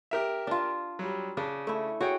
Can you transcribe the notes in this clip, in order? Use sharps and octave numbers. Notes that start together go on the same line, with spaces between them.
G4 A#4 E5
D4 F4
F#3 G3
C#3 D4
A3 E4
F#4 G#4 C#5 G5